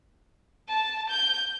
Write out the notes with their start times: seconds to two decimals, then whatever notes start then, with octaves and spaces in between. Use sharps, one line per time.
0.68 A5
1.09 G6